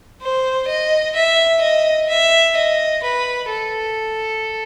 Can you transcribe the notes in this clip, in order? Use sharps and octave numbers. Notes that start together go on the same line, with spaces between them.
C5
D#5
E5
D#5
E5
D#5
B4
A4